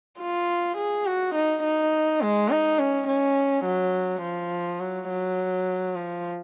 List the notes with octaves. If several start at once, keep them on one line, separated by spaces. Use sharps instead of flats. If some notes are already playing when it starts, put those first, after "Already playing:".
F4
G#4
F#4
D#4
D#4
G#3
D#4
C#4
C#4
F#3
F3
F#3
F#3
F3